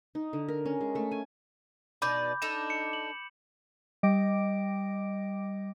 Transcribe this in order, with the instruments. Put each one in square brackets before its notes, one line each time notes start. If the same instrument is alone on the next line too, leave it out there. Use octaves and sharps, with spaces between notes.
[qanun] D#4
D3
A#4
C#4
G#3
A3
G#5
[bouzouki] B2 D#4 D5 [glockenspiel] B5 D6 G6
[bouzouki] D4 D#4 A4 [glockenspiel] E7
[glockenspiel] C#7
F#7
[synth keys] G3 D#5 G5 D6 A#6 D7